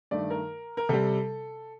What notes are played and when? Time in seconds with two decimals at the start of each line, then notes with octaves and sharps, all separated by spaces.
0.11 G2 D#3 A3 D5
0.30 A#4
0.77 A#4
0.89 C3 G3 A4